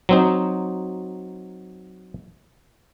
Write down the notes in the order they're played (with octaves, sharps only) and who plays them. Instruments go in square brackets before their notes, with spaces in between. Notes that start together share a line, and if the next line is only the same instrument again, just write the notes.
[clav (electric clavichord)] F#3 C4 D#4